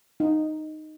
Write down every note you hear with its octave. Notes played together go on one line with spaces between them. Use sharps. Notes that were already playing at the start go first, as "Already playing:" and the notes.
D#4